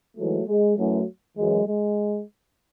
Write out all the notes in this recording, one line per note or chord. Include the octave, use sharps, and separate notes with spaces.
G#2 E3 F#3 A3
G#3
F#2 E3 F#3 A3
F#2 E3 G#3
G#3